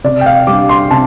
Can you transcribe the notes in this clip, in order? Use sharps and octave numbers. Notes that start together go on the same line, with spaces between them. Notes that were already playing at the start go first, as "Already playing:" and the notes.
C3 D5
G5
F5
G3 D4 D6
C6
C3 A5